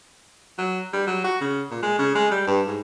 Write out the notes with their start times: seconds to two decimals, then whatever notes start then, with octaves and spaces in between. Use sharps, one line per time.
0.58 F#3
0.93 G3
1.07 F#3
1.24 F#4
1.41 C#3
1.71 A#2
1.83 G#3
1.99 C#3
2.15 G#3
2.31 G3
2.47 G2
2.67 G#2